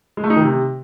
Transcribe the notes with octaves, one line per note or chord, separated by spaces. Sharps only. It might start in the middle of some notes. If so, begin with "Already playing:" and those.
G#3
A3
D#4
D#3
C3